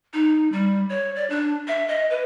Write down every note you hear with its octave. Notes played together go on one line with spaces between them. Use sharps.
D#4
G3
C#5
D5
D4
E5
D#5
B4